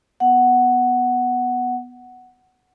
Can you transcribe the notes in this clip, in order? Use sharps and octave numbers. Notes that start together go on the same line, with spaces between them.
B3 F#5